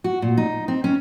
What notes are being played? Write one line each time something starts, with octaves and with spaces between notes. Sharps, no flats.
F#4
A#2
D#4
C4
C#4